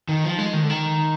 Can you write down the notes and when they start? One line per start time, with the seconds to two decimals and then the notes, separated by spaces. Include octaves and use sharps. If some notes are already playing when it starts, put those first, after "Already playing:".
0.09 D#3
0.24 F3
0.39 G#3
0.53 D#3
0.62 D3
0.70 D#3